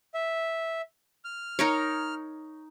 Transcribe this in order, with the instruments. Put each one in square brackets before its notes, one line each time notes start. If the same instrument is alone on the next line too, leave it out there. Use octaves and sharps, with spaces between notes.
[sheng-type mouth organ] E5
F6
[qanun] D#4 A#4 C#5